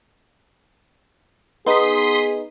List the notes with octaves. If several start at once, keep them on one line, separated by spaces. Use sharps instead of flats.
B3 D#4 G#4 C6 D#6 B6